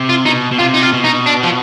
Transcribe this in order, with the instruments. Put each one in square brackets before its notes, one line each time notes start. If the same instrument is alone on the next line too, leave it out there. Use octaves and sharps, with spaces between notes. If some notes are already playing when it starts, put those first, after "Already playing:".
Already playing: [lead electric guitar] C3
[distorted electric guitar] F4
[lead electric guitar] B2 [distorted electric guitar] D#4
[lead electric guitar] B2
[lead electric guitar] C3 [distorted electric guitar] F4
[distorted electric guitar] D#4
F4
[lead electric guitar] B2
[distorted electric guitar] D#4
D4
F3